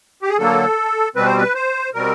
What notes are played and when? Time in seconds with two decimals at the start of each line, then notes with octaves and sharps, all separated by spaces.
0.22 G4
0.29 G#4
0.38 D3 F#3 A#3 A4
1.15 B2 G3 C4 B4
1.26 C5
1.37 B4
1.55 C5
1.94 B2 G3 C4 A#4